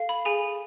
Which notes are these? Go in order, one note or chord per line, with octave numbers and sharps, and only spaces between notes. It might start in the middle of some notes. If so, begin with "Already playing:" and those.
Already playing: A4 F5
B5
G#4 G#5